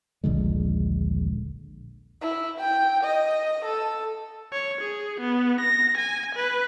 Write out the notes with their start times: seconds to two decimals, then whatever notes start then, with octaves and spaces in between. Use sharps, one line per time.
0.24 D#1 A#1 D3 G#3
2.22 E4
2.60 G5
3.04 D#5
3.65 A4
4.52 C#5
4.82 G#4
5.21 B3
5.61 A#6
5.98 G#5
6.35 B4